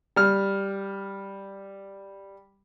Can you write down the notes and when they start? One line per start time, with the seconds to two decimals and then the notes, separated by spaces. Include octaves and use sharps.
0.16 G3 F6